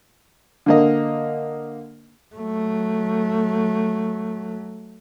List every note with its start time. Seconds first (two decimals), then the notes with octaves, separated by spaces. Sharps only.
0.66 D3 A#3 D#5
2.36 F#3 A3